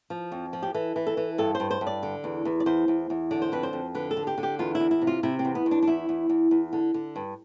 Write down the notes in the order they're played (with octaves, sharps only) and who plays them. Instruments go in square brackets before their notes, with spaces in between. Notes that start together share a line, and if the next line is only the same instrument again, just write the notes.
[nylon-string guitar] F3
F2
F3
G4
E3 A4
E3
A4
E3
G2 A4
C5
G2
C5
G2
D5
D3
E2
E2
D5
E2 C5
E2
E2
D3 D5
C5
F2 B4
C5
F2
D3 B4
A4
D3
G4
D3
G4
E2 F4
E4
E2
E4
C3
F4
C3 E4
C4
E2
B3
E2
D4
D4
E2 E4
E2
E2
E2
D3
D3
G2